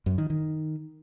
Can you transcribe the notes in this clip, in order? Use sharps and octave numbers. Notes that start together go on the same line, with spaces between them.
F#2
D#3
D#3